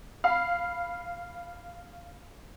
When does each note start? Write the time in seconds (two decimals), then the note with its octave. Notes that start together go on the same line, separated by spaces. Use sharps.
0.24 F5 B5